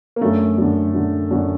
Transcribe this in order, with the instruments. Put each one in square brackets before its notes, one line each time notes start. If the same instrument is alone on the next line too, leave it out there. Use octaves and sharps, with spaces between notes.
[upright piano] A#3
F#2 D3 A3
F#2 D3
F#2 D3
F#2 D3